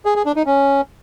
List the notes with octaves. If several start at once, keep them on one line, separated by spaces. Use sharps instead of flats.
G#4
G#4
D4
D#4
C#4